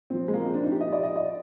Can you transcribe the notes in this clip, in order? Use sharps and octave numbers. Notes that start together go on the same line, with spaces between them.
A#2 F3 C4
G#3
A#3
C4
D4
D#4
G4
D#5
D5
D#5
D5